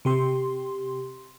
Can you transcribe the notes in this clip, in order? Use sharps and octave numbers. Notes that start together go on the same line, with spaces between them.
C3 G4 C6